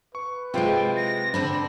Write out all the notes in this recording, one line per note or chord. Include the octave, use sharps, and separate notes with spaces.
B4 C#6
C3 G#3 E4 F4 C5 G5
A#6
D3 C4 D4 B5